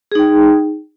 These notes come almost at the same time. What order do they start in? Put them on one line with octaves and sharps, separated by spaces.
G#4 D#4 G5